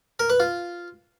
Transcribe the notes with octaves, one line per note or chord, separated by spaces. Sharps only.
A#4
B4
F4